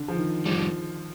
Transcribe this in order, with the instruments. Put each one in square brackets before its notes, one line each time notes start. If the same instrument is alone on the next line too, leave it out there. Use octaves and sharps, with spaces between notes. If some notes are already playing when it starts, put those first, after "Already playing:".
Already playing: [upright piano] D3
F3
D#3
[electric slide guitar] F2 C3 G3 [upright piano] F3